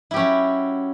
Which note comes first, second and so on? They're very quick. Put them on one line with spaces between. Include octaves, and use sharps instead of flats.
E4 G4 C#4 F#3